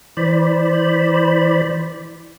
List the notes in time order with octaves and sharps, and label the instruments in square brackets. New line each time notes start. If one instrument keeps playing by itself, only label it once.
[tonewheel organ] E3 C5 D5 B5